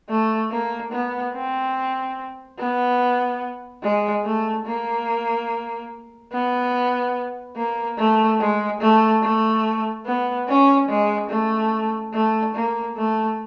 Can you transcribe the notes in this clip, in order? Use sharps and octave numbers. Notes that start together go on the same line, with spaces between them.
A3
A#3
B3
C4
B3
G#3
A3
A#3
B3
A#3
A3
G#3
A3
A3
B3
C#4
G#3
A3
A3
A#3
A3